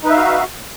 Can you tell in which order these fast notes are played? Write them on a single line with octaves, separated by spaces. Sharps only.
D#4 B4 E5 F5 F#4